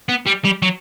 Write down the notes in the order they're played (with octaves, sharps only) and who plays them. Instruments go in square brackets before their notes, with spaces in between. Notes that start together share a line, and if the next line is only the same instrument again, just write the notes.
[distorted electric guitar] B3
G3
G3
F#3